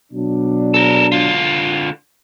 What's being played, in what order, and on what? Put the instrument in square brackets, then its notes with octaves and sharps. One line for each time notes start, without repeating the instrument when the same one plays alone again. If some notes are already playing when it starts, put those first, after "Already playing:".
[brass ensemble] B2 F#3 D4
[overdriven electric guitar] A4 A#4
D3 F4